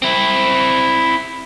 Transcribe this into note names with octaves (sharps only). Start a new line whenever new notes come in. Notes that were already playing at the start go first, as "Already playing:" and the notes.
C4 E4